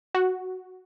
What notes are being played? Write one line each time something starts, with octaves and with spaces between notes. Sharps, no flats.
F#4